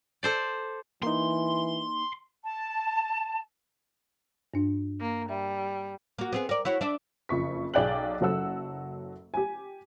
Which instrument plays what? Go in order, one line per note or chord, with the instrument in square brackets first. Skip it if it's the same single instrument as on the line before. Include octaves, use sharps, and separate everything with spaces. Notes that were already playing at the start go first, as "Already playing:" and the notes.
[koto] A4 C5 D5
[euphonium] E3 [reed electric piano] A#3 D#4 [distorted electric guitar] C6
[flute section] A5
[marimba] G2 D4
[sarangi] A#3
[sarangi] G3 [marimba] E5
[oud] A#3 F#4
B3 C4 G#4
A#4 D5
E4 F#4 C#5
D4 D5 E5
[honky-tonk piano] F#1 F2 C#6 B6
B1 G#4 D5 G5 F#6 F#7
F#1 F#3 A4 F#5 E6
G4 G#5